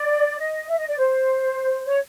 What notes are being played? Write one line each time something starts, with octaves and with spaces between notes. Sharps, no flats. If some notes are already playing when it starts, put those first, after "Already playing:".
Already playing: D5
D#5
E5
D#5
D5
C5
C#5